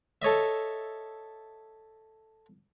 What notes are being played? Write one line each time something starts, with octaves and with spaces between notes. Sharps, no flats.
A4 C#5 D#5 E5